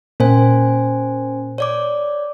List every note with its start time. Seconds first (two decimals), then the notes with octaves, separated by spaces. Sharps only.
0.20 A#2 C#4 C5 G#5
1.58 C#5 D5 D6